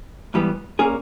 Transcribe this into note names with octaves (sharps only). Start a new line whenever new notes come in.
G#2 E3 G3 B3
A#2 A#3 C#4 G#4